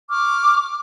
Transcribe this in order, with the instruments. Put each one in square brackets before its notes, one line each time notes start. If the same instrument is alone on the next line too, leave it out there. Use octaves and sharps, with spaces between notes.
[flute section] C#6 D6 F6